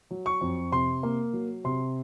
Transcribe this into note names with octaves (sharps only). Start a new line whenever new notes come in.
F#3
C#6
F2
C3 C6
A#3
F#3
C3 C6